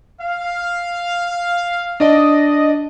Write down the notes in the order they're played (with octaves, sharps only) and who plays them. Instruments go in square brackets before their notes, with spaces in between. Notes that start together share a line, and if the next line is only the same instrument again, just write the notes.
[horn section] F5
[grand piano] D4 D5 [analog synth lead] D#5